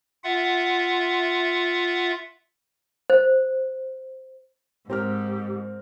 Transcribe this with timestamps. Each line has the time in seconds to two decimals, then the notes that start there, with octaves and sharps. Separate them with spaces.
0.24 F4 E5 F#5
3.10 C5
4.90 G#2 C4 G4 A#4 F6